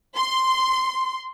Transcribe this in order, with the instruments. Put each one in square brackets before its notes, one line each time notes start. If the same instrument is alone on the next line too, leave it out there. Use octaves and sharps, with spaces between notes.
[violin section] C6